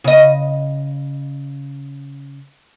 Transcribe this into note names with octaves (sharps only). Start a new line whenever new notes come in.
C#3 D#5